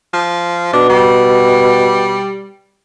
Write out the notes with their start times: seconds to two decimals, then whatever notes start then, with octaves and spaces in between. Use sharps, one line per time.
0.13 F3
0.73 B2 D4
0.90 G3